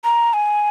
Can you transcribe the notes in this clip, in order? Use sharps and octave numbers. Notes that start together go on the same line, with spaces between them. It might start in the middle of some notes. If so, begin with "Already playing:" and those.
A#5
G#5